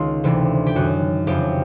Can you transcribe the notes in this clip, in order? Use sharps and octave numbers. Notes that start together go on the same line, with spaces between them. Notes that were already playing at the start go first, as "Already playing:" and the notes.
Already playing: C#2 D#3 F4
D2 C3 E3
G4
F#2 D#3 F#4
F2 C#3 E3 G4